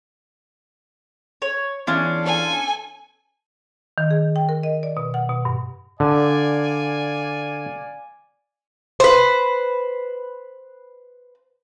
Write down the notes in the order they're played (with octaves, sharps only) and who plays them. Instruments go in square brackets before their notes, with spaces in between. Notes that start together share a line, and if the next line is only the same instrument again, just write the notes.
[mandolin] C#5
[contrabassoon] E2 [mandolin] C#4 D4 [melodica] F4 F5
[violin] A4 G#5
[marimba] D#3
G#4
G5
A#4
D#5
D5
B2
F#5
B2
G2
[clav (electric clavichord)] D3 [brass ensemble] D5 F5 G#5
[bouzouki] B4 C5